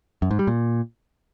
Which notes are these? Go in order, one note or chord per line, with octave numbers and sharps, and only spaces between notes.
F#2
G#2
G3
A#2